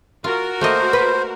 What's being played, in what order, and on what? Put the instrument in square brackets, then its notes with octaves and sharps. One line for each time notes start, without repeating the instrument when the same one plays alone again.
[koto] F4 [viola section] F#4 A#4
[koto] A3 A#3 D#5 [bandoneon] C5
[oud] B4